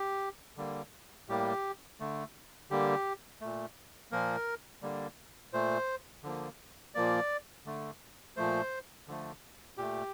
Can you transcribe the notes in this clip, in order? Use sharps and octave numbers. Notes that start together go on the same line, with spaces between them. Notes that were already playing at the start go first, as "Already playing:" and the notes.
Already playing: G4
D3 G3 A#3
A2 G3 A#3 G4
D3 A3
D3 G3 A#3 G4
A#2 A3
A#2 F3 A#3 A#4
D3 G3 A#3
A#2 A3 C5
D3 F3 A#3
A#2 F3 A#3 D5
D3 A3
A#2 F3 A3 C5
D3 F3 A3
A#2 A3 G4